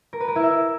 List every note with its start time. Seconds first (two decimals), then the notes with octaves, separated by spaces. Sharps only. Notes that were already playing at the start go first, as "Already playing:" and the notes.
0.13 A#4
0.20 B4
0.28 A#4
0.36 E4
0.43 E5